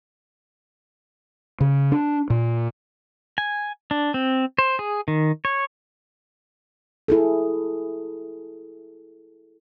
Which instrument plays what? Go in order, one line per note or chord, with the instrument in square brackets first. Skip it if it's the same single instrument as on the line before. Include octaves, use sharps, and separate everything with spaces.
[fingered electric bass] C#3
D4
A#2
[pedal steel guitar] G#5
D4
C4
C5
G#4
D#3
C#5
[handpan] E4 G#4 A4